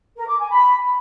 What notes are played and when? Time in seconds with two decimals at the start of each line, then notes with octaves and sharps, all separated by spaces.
0.16 A#4
0.27 D6
0.39 G#5
0.50 B5